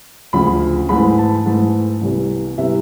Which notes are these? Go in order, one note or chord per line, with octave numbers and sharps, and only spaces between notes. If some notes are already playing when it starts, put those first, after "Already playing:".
D2 C#3 F3 B5
G#2 E3 A3 B5
A5
G#2 E3 A3
C2 C3 E3 G3 B3
C3 E3 G3 B3 E5